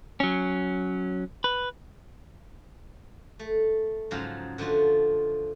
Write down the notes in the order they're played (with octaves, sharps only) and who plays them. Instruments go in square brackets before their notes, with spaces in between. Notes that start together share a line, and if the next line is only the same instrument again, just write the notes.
[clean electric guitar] F#3 C#4
B4
[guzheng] A3
G#2 C#3 F3 F#3 F5 A#5
D3 F3 A3 F4 F#4